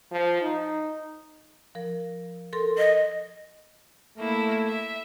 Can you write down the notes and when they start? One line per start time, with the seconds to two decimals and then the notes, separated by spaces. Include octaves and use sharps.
0.11 F3
0.42 D#4
1.75 F3 A#4
2.53 A4 A#4 C6
2.78 D#5
4.18 A3 A#3 E4
4.67 E5